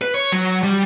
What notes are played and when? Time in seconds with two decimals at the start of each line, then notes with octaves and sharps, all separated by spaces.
0.02 B4
0.14 C#5
0.32 F#3
0.63 G3